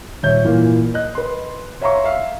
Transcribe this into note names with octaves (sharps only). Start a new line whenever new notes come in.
D#1 C#5 E5 G6
A#2 E3 A#3 F5
D#5 F#6
B4 C6
C#5 E5 F5 A#5 C6 C#6
E5 F5